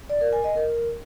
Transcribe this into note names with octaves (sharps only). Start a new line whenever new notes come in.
D5
A#4
G#5
D#5
A#4